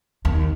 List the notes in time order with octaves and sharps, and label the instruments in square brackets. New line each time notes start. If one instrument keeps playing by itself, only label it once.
[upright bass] D#2